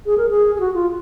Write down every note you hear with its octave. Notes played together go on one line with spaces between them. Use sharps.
G#4
A#4
G#4
G#4
F#4
F4